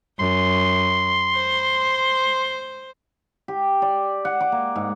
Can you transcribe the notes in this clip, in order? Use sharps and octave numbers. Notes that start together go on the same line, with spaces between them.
F#2 C6
C5
G4
D5
F#5
D6
A#3
G#2